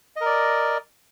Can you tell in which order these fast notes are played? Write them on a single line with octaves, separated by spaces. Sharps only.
D#5 A#4 D5